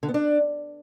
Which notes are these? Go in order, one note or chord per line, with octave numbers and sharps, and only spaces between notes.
D3
B3
D4